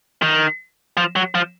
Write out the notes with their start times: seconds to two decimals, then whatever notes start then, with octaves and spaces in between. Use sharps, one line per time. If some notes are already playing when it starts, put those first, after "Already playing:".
0.22 D#3
0.97 F3
1.16 F#3
1.35 F3